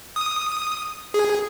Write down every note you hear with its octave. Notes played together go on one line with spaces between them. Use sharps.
D#6
G#4